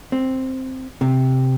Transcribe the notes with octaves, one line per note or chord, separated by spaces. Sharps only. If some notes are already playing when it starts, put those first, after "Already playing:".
C4
C3